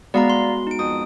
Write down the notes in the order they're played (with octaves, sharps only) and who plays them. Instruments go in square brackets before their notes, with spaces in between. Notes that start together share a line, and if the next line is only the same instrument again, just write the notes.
[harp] G#3 B3 F#4 [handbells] D5 F5 A#5
[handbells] C6
D#4 D7
[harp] F2 [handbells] D#6